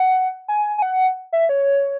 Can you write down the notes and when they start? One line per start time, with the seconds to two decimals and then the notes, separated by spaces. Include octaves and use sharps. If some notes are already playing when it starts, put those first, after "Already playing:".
Already playing: F#5
0.48 G#5
0.78 G#5
0.82 F#5
1.33 E5
1.49 C#5